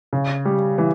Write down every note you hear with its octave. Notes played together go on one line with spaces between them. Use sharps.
C#3
G3
E3